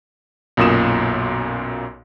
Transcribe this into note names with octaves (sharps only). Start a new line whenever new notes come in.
B1 F#2 A#2 D#6 E7